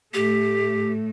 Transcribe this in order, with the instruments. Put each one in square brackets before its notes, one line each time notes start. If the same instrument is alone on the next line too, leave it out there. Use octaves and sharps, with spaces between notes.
[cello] A2 A3 [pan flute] G4